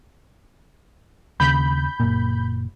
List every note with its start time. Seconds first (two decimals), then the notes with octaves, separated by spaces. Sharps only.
1.40 D#2 C#3 B5 G6
2.00 F#1 A#2